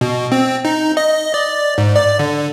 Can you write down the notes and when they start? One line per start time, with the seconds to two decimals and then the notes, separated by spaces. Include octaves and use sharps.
0.01 B2
0.32 C4
0.65 D#4
0.97 D#5
1.34 D5
1.78 G#2
1.96 D5
2.19 D3